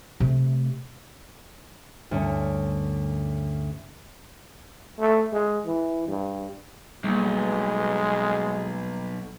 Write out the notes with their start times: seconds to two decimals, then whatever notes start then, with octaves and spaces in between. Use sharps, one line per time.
0.20 C3 A3
2.11 D2 G2 C#4 A#4
4.99 A3
5.33 G#3
5.66 E3
6.08 G2
7.04 B1 G3 G#3 A#3